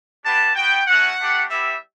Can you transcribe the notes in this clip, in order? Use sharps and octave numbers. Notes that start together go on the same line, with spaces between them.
G3 B3 D4 G4 A5
B3 F#4 G5
A3 C#4 F#4 F#5
A3 D4 G4
G3 B3 E4 G4 E5